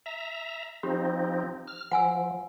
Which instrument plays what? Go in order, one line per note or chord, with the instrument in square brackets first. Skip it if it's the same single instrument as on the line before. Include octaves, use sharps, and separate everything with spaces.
[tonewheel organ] E5 A#5
[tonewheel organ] F3 C4 D#4 [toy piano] G4
[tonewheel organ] F6
[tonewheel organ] F3 [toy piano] F#5 G#5 E6